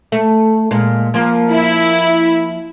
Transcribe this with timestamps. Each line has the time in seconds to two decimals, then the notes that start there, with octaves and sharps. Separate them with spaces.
0.12 A3
0.71 A#2 G#3
1.14 F3 A#3
1.52 E4